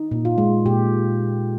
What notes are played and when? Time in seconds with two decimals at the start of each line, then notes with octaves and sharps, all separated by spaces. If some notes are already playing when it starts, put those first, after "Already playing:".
Already playing: D#4
0.11 A#2
0.25 F4
0.38 G#3
0.66 A#2 G4